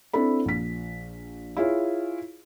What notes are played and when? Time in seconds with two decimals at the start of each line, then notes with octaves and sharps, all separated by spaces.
0.13 C4 D4 E4 A4 B5
0.45 A#1 B6
1.57 E4 F4 G#4 C#5